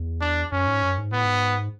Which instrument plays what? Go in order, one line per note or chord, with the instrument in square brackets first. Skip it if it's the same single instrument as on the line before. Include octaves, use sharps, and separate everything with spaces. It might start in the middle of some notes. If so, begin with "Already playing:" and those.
Already playing: [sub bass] E2
[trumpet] D4
[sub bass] F#2 [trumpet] C#4
[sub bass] G#2
F#2
G#2
[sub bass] A2 [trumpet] B3
[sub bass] G#2